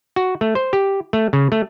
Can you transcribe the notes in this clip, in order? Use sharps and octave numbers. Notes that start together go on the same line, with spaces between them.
F#4
A3
C5
G4
A3
C#3
A3